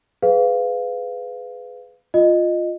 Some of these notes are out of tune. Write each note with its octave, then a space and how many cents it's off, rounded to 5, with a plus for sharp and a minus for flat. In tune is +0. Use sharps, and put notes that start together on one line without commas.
G#4 +20 B4 +25 F5 +0
F4 +5 D#5 -10